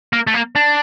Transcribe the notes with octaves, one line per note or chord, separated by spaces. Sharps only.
A#3
A3
A#3
D4